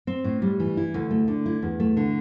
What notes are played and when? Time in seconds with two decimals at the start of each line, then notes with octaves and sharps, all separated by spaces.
0.07 C4
0.24 A2
0.42 G3
0.60 E3
0.77 E4
0.94 D2
1.11 A3
1.28 D3
1.46 E4
1.63 E2
1.80 A3
1.97 D3